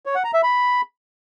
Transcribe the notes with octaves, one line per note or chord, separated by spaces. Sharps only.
C#5
F#5
A#5
E5
B5